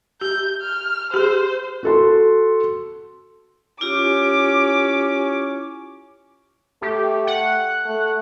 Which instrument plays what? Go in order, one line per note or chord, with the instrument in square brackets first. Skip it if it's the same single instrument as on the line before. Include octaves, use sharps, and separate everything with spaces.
[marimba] G4 [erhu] G6
[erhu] F6
[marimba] G4 G#4 [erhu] C5
[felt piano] F#4 A4 C6
[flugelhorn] C#4 [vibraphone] E4 F4 G4 [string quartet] D6
[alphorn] A3 [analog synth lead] G4
[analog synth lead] F#5
[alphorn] A3